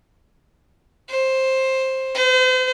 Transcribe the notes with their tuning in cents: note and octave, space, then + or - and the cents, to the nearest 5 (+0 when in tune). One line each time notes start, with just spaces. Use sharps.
C5 +10
C5 -40